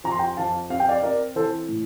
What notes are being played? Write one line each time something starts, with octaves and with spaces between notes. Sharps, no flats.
F2 A#5
C6
G5 A#5
F2 F5 A5
C4 F5
G5
D5 F5
C4 A#4 D5
E3 A4 C5
A2